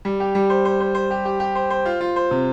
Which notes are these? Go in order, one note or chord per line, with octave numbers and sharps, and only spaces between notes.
G3
G4
G3
C5
C5
C5
C5
G4
G4
G4
C5
C5
F4
F4
C5
C3